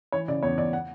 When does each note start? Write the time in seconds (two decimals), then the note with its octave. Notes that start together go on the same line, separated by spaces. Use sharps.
0.12 E3 C#5
0.28 C#3 D5
0.43 E2 C#5
0.57 E2 D5
0.73 F#5